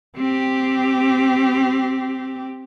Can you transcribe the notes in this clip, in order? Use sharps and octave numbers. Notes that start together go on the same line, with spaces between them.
C4 G4